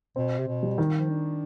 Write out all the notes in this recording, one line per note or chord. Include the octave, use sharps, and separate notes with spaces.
B2 C4
C3
B2
G3
D#3
F3
D4